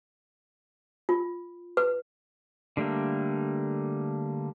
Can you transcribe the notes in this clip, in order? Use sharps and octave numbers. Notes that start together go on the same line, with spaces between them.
F4
B4
D3 G3 A3 A#3